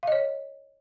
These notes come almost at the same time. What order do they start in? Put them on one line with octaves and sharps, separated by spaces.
F5 D#5 C#5